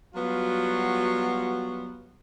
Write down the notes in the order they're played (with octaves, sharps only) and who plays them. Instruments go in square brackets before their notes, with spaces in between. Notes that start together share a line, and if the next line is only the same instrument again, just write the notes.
[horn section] F#3 G3 B3 F4 F#4